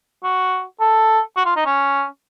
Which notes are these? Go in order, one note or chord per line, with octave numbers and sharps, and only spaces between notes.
F#4
A4
F#4
F4
D#4
C#4